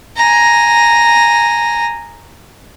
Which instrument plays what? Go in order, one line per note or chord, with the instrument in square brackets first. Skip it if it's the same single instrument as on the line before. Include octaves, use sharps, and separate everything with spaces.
[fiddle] G#5 A#5